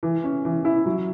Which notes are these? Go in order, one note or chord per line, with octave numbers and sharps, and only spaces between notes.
E3
C#4
E3
E4
F#3